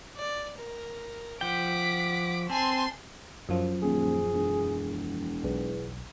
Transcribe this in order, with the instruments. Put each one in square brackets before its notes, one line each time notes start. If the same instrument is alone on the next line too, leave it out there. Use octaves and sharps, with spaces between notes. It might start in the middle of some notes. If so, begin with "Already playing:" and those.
[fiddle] D5
A#4
[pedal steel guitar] F3 G5 [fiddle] F#5 [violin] D6 B6
[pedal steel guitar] C4 [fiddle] G#5 A5 [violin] C6
[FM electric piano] F#2 F3
[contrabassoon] D#1 [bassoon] G#4
[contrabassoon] E1
[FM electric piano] B1 [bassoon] E2